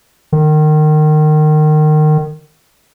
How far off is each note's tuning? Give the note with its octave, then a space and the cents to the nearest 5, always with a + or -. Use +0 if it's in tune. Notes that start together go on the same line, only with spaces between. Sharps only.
D#3 -25